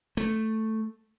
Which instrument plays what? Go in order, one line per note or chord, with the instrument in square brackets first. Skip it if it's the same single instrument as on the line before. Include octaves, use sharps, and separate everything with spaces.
[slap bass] A3